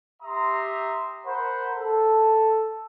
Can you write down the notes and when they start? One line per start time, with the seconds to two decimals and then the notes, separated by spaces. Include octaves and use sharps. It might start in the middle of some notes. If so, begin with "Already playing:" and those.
0.22 G4 E5 A#5 C6 D#6
1.26 A#4 C5 F#5 B5
1.75 A4